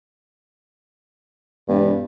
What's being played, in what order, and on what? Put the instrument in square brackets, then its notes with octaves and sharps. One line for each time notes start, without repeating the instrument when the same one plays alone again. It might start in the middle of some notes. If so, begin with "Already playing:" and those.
[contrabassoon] E1 [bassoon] G2